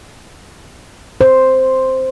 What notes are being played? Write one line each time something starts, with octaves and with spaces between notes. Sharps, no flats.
C5